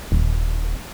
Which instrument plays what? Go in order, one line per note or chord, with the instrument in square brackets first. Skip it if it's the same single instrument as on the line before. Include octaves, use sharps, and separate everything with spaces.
[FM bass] D#1